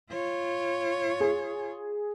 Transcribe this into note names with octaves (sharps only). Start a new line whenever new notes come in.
F4 C#5
G#4